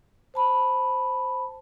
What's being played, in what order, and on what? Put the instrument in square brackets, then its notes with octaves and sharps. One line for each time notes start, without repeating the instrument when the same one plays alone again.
[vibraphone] C5 A5 B5